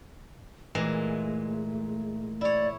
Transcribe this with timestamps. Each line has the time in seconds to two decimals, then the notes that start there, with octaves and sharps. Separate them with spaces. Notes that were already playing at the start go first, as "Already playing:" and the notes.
0.75 A#2 E3 G#3 A3
2.41 E4 C#5 D5